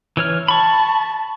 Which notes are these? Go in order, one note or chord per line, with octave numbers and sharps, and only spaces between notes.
E3 C#5 F6
A5 B5 C#6